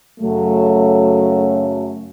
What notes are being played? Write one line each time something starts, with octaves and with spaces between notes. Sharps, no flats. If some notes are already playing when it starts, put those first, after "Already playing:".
F#2 C#3 F#3 A3